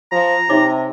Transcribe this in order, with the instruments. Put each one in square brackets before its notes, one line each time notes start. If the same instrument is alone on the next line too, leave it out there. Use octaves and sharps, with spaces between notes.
[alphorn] F3 [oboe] A#5
[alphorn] C3 [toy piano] D#4 C#5 D6